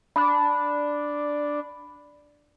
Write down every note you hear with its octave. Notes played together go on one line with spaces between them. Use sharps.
D4 B5